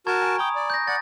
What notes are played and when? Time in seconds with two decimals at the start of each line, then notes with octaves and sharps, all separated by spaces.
0.07 F#4 A#4 A5 A#5 C#6 G#6
0.23 G#5 D7
0.38 G5 A#5 B5 D#6
0.56 D5
0.70 G6 A#6
0.88 D5 F#5 A6